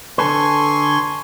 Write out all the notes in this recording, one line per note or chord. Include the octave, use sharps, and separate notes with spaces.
D3 A4 B4 G#5 C6 C#6